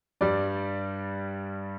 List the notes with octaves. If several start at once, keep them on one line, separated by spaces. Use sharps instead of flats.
G2 G3 D5